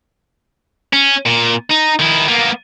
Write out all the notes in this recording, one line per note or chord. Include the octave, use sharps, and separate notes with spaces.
C#4
A#2
D#4
D#3 E4
A#3 B3